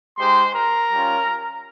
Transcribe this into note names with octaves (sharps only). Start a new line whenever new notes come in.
G#3 D#4 G4 C5 C6
A#4 A#5
G3 C#4 F4